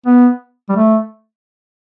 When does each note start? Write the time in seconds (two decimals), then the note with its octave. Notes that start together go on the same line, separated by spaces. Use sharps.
0.06 B3
0.69 G3
0.76 A3